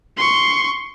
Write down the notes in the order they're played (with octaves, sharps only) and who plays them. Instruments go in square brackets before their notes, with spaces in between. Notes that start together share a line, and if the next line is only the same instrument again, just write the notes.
[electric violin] C6 C#6